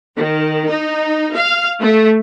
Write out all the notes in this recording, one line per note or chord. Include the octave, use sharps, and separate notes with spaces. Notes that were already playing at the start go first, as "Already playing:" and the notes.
D#3
D#4
F5
A3